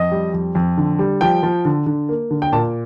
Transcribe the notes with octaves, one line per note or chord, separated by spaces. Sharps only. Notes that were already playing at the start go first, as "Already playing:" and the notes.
Already playing: F2 D#5
G3
F2
F2
D3
G3
F3 G5
F3
D3
D3
A#3
D3
G5
A#2 A5